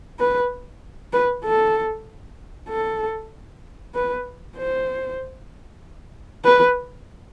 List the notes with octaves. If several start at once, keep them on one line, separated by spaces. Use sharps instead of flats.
B4
B4
A4
A4
B4
C5
B4